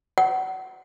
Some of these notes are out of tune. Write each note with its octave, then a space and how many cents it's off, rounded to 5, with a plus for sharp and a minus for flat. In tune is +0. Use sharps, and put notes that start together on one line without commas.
F#5 +30